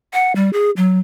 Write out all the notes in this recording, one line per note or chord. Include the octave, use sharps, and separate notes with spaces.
F#5
G3
G#4
F#3